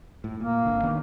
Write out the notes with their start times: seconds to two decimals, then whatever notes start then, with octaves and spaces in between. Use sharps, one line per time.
0.24 A2
0.40 A#2 A#3
0.66 G#1 D3
0.83 D#3 B3 D4